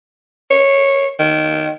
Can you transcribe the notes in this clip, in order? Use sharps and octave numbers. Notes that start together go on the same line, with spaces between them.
C#5
D#3